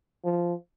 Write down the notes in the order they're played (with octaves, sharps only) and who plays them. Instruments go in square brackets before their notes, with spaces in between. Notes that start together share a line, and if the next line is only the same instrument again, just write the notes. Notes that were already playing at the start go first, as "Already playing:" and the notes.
[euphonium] F3